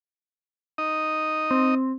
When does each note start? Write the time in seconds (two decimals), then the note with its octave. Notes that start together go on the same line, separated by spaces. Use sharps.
0.78 D#4 D#5
1.51 C4